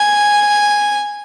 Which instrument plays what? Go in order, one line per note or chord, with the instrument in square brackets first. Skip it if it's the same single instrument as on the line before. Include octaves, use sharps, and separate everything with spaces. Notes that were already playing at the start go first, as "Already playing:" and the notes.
Already playing: [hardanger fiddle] G#5